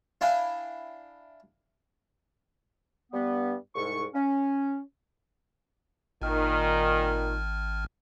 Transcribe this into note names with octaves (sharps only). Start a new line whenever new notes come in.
D4 E4 F5 G5 G#5
G2 G3 B3
C2 G#2 C#6
C#4
G#1 A#2 D#3 F6